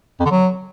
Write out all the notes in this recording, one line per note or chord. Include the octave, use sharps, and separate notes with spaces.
F2
D3
F#3